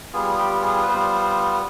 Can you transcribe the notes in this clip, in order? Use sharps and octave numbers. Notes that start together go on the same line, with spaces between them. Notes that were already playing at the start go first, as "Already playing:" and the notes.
G3 B3 F4 G#4
G4
G#4
B4
G3 B3 F4 C5